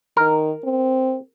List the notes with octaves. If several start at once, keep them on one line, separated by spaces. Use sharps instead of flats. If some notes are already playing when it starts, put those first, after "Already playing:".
D#3 A#4
C4